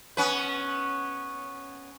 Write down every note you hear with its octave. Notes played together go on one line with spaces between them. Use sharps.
B3 C#4 B4